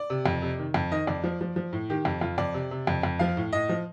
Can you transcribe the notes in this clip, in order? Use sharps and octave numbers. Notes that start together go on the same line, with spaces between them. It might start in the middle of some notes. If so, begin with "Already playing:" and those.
Already playing: D5
C3
F2
C3
D#3
F2
D#3 D#5
F2 D5
F3
F3
F3
A2
D#3 G4
F2
F2 F4
F2 D5
C3
C3
F2
F2
F3 F5
A2
A2 D#5
F3